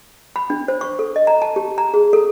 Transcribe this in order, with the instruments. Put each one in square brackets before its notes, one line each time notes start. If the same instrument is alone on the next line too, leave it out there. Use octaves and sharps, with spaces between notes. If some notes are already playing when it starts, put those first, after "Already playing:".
[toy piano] B5
D4
C5
C#6
A4
D#5
A#5
A5
G4
A#5
G#4
A4